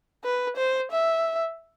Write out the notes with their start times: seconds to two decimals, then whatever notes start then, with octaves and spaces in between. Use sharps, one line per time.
0.24 B4
0.57 C5
0.92 E5